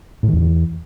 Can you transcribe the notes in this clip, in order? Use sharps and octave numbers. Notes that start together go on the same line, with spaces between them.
A2
D#3
E2